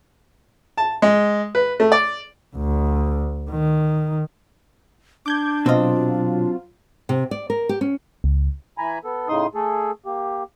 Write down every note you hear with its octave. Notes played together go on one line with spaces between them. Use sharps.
A5
G#3
B4
A3
D5
D2
D#3
D4 D6 G6 G#6
B2 F#3 C4 F4 D#5
C3
D5
A#4
G4
C#4
C#2
E3 G#5 A#5 B5
B3 A4
A2 C#3 D#4 C6 D#6
A3 G#4 A4
A#3 G4